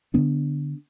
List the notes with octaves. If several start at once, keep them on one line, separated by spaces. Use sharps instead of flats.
D3 F3 B3 D4